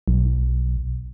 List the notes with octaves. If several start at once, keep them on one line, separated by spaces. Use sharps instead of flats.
B1